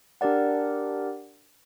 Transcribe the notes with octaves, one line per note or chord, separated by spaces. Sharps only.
D4 G4 A#4 D5 F#5